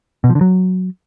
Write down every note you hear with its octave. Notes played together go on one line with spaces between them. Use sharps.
B2
F3
D3
F#3